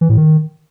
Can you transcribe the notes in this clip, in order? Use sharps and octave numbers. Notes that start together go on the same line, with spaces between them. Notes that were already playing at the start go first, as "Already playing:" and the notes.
E3
A2
D#3